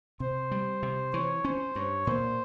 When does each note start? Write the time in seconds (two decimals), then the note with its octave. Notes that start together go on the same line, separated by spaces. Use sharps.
0.20 C3 C5
0.51 G3
0.83 C3
1.13 E3 C#5
1.45 C#4 C5
1.75 G2 C#5
2.06 A#2 C5